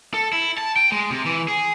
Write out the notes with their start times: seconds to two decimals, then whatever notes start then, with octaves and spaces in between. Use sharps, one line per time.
0.14 A4
0.33 E4
0.58 A5
0.77 G5
0.92 G#3
1.10 C3
1.26 E3
1.48 G#4